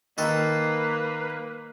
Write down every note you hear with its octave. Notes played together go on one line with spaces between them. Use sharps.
D#3 A#3 A4 B4